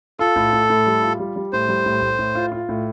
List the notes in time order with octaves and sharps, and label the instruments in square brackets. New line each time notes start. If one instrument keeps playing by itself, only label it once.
[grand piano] F4 [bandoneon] A4
[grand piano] A2
A2
A2
G3
F4
G3
G3
[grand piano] A2 [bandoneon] C5
[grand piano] G3
A2
A2
A2
F4
F4
A2